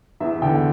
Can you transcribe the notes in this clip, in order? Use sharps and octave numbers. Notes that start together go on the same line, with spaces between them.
E2 E5
D3 G5